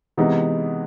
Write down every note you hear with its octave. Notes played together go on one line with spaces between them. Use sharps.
C3 E3 G#3 B3 D#4